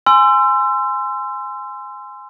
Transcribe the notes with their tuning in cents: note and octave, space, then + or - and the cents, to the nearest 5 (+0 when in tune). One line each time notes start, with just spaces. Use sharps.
G#5 +0 C6 -15 E6 +30